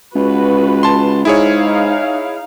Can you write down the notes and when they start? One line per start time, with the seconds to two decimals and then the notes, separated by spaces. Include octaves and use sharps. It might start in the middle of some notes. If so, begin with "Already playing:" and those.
0.15 C#2 F#4 B4
0.83 A5 C6
1.25 G#2 D#4 E4 G#4 C#5 F5